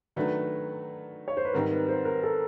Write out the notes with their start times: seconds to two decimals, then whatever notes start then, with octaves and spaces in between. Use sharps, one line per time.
0.16 D#3 F#3 A3 D4 B4
1.28 C#5
1.37 C5
1.45 B4
1.54 G#2 D#3 G3 C4 D#4 A#4
1.71 B4
1.89 C5
2.05 A#4
2.23 A4